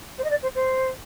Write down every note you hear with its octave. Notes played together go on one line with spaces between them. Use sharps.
C5
D#5
D5
C5
C5